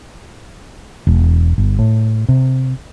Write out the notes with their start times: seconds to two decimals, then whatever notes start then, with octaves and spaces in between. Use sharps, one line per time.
1.07 E1
1.58 G1
1.79 A2
2.29 C3